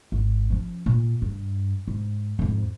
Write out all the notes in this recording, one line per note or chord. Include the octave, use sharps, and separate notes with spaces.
G#1
F3 C#4
A#2
G2
G#2
F2 G#2